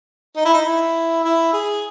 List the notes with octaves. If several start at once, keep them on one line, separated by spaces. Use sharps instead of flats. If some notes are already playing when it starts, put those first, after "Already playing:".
D#4
E4
D#4
E4
E4
G#4